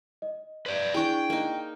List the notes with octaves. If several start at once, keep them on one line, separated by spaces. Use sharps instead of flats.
D#5
B4 D5
D4 E4 G#4 G5 C#6 D7
A#3 D#4